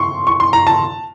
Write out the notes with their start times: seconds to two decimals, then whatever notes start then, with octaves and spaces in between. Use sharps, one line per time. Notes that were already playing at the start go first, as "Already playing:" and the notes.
Already playing: C6 C#6
0.27 C#6
0.40 C6
0.53 A#5
0.67 A5